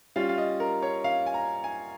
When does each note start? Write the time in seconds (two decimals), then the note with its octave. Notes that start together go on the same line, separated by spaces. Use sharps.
0.16 G3 C#4 F4 F5
0.29 F5
0.38 D#5
0.60 A#4
0.82 C#5
1.04 F5
1.26 G#5
1.34 A#5
1.64 G#5